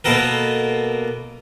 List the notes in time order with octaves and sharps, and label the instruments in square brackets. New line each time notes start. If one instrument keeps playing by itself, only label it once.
[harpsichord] B2 A#3 B3 A4 A#4